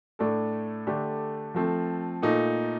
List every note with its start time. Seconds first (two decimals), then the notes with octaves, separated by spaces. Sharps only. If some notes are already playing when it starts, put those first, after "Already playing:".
0.19 A2 A3 D4 A4
0.87 D3 A3 D4 G4
1.55 F3 A3 C4
2.22 A#2 A3 D#4